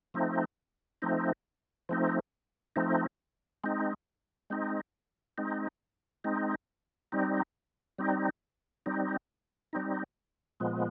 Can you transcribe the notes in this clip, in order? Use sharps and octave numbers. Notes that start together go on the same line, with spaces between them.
F3 A3 C4 D#4
F3 A3 C4 D#4
F3 A3 C4 D#4
F3 A3 C4 D#4
G#3 C4 D#4
G#3 C4 D#4
G#3 C4 D#4
G#3 C4 D#4
G3 C4 D#4
G3 C4 D#4
G3 C4 D#4
G3 C4 D#4
A#2 F3 G#3 B3